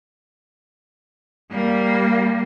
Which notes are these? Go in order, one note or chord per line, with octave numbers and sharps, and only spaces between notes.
G3 A#3